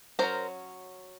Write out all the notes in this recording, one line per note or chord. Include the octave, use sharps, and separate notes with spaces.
F#3 A#3 C#4 A#4 C5